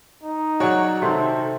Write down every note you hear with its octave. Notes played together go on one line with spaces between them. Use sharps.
D#4
F#3 F#4 G#4 C#5 D5
C3 D#3 C4 A4